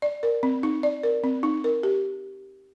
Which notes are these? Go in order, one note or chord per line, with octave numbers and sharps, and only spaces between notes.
D5
A#4
C4
D#4
D5
A#4
C4
D#4
A#4
G4